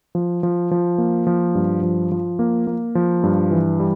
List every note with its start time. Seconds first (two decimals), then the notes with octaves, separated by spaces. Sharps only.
0.15 F3
0.43 F3
0.71 F3
0.98 A#3
1.27 F3
1.55 G2
1.83 F3
2.12 F3
2.39 A#3
2.67 A#3
2.95 F3
3.23 G2
3.51 E3
3.80 G3